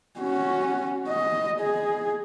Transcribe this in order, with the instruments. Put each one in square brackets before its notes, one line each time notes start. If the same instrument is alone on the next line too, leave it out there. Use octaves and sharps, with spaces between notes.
[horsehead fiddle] C#4 F#4
D#5
G#4